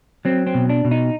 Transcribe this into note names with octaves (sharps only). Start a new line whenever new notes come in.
F#3 C4
C4
B2
D4
B2
D#4